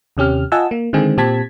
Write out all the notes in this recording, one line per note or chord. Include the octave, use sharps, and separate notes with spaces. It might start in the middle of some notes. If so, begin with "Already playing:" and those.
D#2 C3 C#4 G4 F6
F4 D#5 F#5 G#5 A5 E6
A#3
D3 D#3 G#3 C4 G#4
A#2 C4 G4 A5 G#6 B6